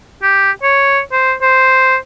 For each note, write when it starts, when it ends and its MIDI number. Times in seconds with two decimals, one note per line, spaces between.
0.23 0.51 67
0.63 1.00 73
1.12 1.33 72
1.42 1.96 72